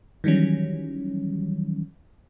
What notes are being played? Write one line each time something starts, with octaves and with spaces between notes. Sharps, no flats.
D#3 E3 F#3 G3 C#4